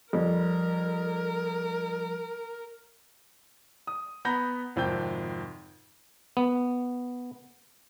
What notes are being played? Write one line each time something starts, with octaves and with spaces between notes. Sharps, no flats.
F2 F3 G3 A#4
D#6
B3 A#5 B5 G6 A#6
G#1 F2 C3 G5 G6
B3